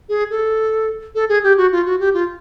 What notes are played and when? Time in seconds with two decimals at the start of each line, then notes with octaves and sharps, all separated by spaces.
0.09 G#4
0.31 A4
1.15 A4
1.29 G#4
1.43 G4
1.57 F#4
1.72 F4
1.86 F#4
2.00 G4
2.14 F4